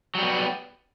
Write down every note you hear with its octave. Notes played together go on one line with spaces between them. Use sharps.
F#3 G3 B3